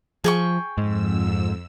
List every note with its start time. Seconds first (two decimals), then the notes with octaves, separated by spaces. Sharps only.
0.24 F3 G#4 G5 C#6
0.78 F2 G#2 E6